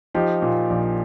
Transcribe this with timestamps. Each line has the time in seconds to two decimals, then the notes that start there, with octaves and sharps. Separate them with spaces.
0.15 F3 D#4 G4
0.42 A#2
0.70 A#1